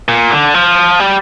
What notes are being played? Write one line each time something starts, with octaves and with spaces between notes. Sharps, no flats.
A#2
D3
F3
G3